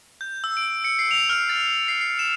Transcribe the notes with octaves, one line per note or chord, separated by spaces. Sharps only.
G6
E6
D7
C#7
C7
F7
F6
A6
C7
C7
E7